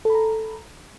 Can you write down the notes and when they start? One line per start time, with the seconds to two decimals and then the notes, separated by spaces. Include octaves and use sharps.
0.05 A4
0.10 B5
0.14 A#5